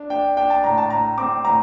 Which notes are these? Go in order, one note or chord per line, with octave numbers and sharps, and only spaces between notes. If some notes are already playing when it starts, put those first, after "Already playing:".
Already playing: D4
D4 G5
D4 G5
A5
A2 A#5
A5
A2 A#5
C4 D6
A2 A#5